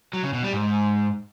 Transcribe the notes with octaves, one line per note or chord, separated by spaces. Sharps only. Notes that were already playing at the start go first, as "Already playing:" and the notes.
F#3
C#3
B2
G3
G#2